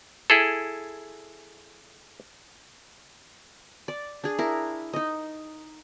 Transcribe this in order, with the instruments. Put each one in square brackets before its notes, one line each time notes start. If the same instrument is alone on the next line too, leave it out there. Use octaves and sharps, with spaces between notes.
[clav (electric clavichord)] E4 G#4 A4
[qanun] D5
D4 G#4
E4 A#4
D#4 D#5